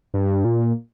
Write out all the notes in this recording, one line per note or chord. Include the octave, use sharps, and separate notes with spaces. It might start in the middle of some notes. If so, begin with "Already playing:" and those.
G2
A#2